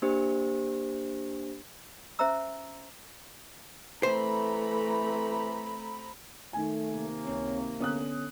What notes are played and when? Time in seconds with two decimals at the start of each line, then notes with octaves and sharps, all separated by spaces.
0.02 A#3 D4 G4 C5
2.19 C#4 C5 E5 A#5 E6
4.03 E3 A3 C4 C5 A#5 B5
6.53 D#3 A3 G#5
6.90 C3 A#3
7.25 C#2 C4 C#5 C#6
7.80 D3 B3 C#4 D#6 F#6